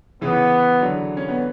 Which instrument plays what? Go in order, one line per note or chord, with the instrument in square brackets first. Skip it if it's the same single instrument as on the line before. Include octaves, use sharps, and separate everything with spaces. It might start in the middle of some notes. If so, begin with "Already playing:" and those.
[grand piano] C#3 E3 [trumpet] B3
[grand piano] D3 F#3
C#4
B3